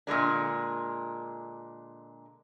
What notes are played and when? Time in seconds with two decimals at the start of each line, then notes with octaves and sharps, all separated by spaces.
0.07 A#2 D3 G#3 D4